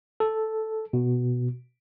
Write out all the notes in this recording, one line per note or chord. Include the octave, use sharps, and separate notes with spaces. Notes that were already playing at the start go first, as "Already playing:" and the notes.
A4
B2